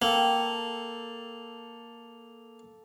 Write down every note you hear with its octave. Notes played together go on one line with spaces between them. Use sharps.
A#3 A4 G5